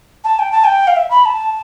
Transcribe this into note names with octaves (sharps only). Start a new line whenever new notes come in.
A5
G5
A5
G5
F5
E5
B5
A5